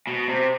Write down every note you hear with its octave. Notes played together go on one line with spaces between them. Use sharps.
B2
C3